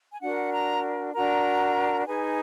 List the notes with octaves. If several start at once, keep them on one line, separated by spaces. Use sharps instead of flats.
G#5
D4 F#4 A#4 F#5
A#5
D4 F#4 A#4 A#5
D#4 G#4 B4 G#5